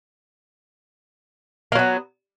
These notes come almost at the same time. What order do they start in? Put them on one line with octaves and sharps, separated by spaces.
A#3 F#3 B3